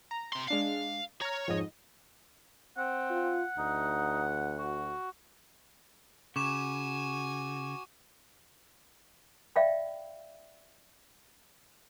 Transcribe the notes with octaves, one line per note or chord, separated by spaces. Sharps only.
A#5
C3 C6
G#3 D4 F5 C7
C#5 A#5 F6
F2 G#2 D#5
C4 F#5
F4
D2 D#4
F#4
C#3 F#4 G#5 C#6 D6 E7
D5 E5 F5 G5 B5